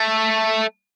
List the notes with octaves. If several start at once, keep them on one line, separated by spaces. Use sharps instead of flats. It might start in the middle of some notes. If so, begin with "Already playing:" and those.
Already playing: A3